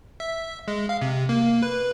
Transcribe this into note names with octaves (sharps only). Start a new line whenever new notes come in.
E5
G#3
F5
C3
A#3
B4